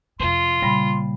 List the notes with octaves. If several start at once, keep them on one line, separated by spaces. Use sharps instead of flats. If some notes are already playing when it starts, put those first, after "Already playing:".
F2 C3 F4 C6
A#2 C#3 G3 B5